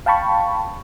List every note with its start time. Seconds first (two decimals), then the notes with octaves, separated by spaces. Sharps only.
0.06 F5 G5 A5 B5 C#6